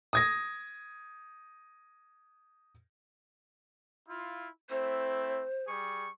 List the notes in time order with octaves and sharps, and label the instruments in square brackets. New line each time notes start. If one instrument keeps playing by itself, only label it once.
[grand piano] D#6 G#6 A#6
[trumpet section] E4 F4
[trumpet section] A3 C4 E4 [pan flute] C5
[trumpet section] G3 G#4 C#6